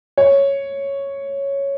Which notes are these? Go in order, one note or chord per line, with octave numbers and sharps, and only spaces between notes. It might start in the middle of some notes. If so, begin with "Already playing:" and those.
C#5